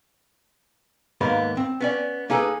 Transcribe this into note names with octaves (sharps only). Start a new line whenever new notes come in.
D#2 G#2 A#3 B3 B5
C4
B3 C#4 D5
A#3 D#4 G#4 A4 B4